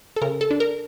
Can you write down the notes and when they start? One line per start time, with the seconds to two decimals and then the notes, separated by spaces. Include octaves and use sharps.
0.16 A4
0.22 C#3 A#4
0.41 A4
0.51 D4
0.60 A#4